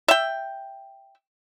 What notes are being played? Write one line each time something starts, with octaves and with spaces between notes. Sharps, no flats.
E5 G5